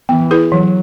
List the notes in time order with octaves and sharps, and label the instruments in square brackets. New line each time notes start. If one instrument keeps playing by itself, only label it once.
[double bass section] E3 [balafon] B3
[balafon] E4 G#4 B4
[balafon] E3 [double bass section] F#3